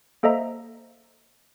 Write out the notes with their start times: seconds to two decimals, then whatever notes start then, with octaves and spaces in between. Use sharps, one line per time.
0.23 A#3 A4 C5 D#5 E5 A#5